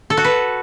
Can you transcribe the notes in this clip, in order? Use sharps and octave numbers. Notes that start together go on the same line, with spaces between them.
A4
F#4
B4